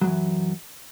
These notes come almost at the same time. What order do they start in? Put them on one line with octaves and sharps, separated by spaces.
F#3 F#2 E3